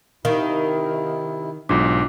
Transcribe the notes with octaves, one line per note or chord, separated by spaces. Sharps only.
C3 D#3 E4 F5
B1 G#2 D4 F4 D6